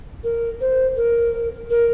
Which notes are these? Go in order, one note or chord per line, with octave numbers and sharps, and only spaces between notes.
A#4
C5
A#4
A#4